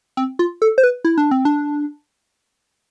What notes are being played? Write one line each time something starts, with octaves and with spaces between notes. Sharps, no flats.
C4
F4
A4
C5
B4
E4
D4
C4
D4